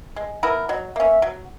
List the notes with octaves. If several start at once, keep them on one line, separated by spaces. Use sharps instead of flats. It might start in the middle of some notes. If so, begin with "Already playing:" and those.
G#3
B3 E4 A#4
F#3 D#5
A#3 C#4 E5
F#3